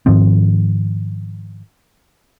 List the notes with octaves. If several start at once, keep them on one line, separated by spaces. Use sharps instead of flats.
G#2 D#3 F3 C4